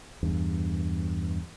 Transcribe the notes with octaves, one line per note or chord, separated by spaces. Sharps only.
E2 G2